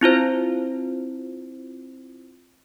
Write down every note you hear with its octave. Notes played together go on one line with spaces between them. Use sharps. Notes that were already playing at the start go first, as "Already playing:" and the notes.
C4 E4 F4 C5